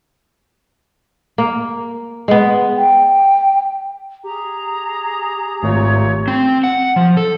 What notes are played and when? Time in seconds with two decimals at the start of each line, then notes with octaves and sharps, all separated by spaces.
1.38 A#3
2.28 G#3 B3
2.76 G5
4.24 G4 G#4 A#5
5.63 G#1 A#2 A3 C#5
6.28 C4
6.64 F#5
6.96 F3
7.17 A4